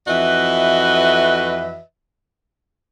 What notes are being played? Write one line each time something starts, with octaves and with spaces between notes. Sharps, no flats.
F2 E3 F#4 B4 D#5 E5